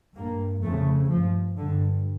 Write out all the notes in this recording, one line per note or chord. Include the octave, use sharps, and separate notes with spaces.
G2 A#3
F2 C#3 A3
G2 F3
G2 D3